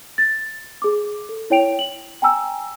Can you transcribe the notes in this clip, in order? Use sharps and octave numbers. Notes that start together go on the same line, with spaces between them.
A6
G#4 D6
A4
E4 C#5 G5 D7 F7
F#7
G5 G#5 A#5 E6